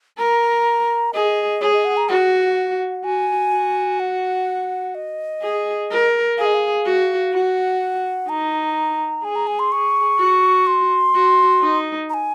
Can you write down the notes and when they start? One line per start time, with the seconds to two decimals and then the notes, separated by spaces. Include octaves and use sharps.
0.18 A#4 A#5
1.13 G#4 D#5
1.61 G#4 C#5
1.73 D#5
1.85 F#5
1.97 A#5
2.09 F#4 F#5
3.04 F#4 G#5
3.52 F#4
4.00 F#5
4.95 D#5
5.42 G#4
5.90 A#4
6.37 G#4 F5
6.45 D#5
6.54 F5
6.86 F#4
7.33 F#4 F#5
8.29 D#4 A#5
9.24 G#4 G#5
9.36 A#5
9.47 G#5
9.59 C6
9.72 G#4 C#6
10.19 F#4
10.67 C6
11.15 F#4
11.62 D#4
12.09 A#5
12.14 G#5